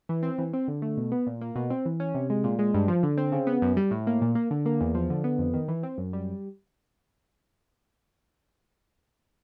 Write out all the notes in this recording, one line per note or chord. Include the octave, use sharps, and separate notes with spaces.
E3
C4
E3
C4
D3
A3
B2
B3
A#2
A#3
B2
C4
E3
C#4
C3
G#3
A#2
G#3
G2
F3
D3
C4
C#3
B3
F#2
G3
A2
A#3
A#2
A#3
D3
A#3
E2
F3
D3
B3
F2
D#3
E3
C4
F#2
G3